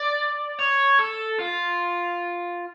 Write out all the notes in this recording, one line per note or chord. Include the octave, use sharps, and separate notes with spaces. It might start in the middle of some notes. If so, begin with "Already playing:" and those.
Already playing: D5
C#5
A4
F4